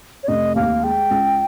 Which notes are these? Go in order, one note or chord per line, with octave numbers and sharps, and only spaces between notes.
C#5
F1 D#5
D#2 F5
G#3 G5
C#2